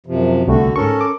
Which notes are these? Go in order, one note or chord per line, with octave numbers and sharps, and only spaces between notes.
F#2 C3 F3
C2 D3 G3 A3 F#4
G#2 C#4 A4 A#4 C#6
D6